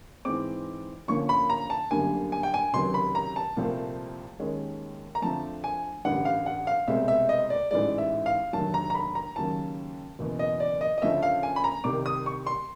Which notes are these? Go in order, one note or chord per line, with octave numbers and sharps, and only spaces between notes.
G#2 E3 G#3 C4 D6
D2 D3 F3 A#3 C#4 C#6
B5
A#5
A5
G1 F#2 D3 G3 A#3 G#5
G#5
G5
G#5
C#2 C3 D#3 F#3 C6
B5
A#5
A5
C2 A#2 F3 A3 C4
D#2 D#3 G#3 C#4
A#5
F2 D3 F3 A3 C4 A5
G#5
A1 G2 D3 G3 F#5
F5
F#5
F5
C2 B2 G#3 C4 E5
E5
D#5
D5
A1 G#2 E3 G#3 D5
E5
F5
F1 D#2 D3 F#3 A3 A5
A#5
A#5
B5
A#5
D#2 C#3 F#3 A5
F#1 E2 B2
D#5
D5
D#5
D#5
D2 C#3 F3 A3 C#4 E5
F5
G#5
B5
A#5
C2 C3 D#3 D6
D#6
C#6
C6